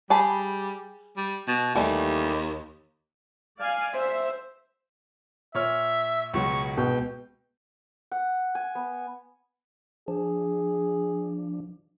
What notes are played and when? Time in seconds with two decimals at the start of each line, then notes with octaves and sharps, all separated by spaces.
0.10 G3 G#4 A5 B5
1.17 G3
1.47 B2
1.75 D#2 E3 G3 A3
3.59 D5 F5 G#5
3.94 C5 E5
5.55 A#2 C#5 E5 F6
6.34 C#2 B2 F#3 C#6
6.77 C#2 B2 G5
8.12 F#5
8.55 G#5
8.75 B3
10.08 F3 D4 G#4